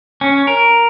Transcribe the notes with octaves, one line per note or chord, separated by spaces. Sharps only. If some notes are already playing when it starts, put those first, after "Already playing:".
C#4
A#4